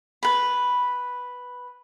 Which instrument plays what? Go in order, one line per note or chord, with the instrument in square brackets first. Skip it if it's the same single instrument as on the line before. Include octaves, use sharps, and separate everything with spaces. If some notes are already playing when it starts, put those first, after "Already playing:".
[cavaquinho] B4 B5